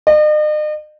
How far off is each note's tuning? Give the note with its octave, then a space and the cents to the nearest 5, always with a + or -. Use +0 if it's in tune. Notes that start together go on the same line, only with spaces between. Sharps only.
D#5 -45